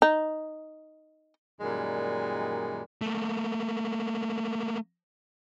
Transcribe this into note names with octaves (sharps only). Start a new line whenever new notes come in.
D#4
F#2 A#2 D#3 G3 G#3
A3 A#3